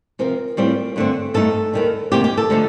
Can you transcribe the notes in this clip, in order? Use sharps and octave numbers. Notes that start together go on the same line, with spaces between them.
C3 F3 C4 F4 A#4
A2 G3 C4 F4
G2 D3 A3 C4
G2 D3 A3 D#4 A4
D#2 D#3 G3
D2 C3 D#3 A#3 G4
G4
A4
D3 F3 A3 D#4